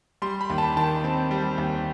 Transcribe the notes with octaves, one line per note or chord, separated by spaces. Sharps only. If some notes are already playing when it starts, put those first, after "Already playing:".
G3 C6
B5
D#2
A5
D#3 A5
C4
G3
D#2